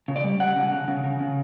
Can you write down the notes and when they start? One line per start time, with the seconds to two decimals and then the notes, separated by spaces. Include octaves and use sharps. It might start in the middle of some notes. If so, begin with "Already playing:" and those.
0.08 C#3
0.16 D5
0.24 G3
0.40 G3 F#5
0.56 C#3
0.71 C#3
0.88 C#3
1.04 C#3
1.20 C#3